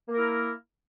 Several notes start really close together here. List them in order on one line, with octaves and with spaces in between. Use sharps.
A#3 A#4 E4